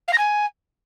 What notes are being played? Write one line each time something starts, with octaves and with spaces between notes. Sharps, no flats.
F5
A#6
G#5